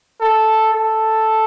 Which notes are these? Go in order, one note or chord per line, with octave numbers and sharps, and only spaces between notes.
A4
A4